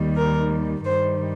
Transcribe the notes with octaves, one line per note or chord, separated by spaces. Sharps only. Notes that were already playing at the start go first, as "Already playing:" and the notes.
Already playing: D#2 D#3 G3
A#4
G2 D#3 G3 C5